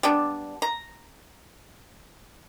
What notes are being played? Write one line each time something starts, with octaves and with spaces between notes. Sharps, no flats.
G3 B3 D4
A#5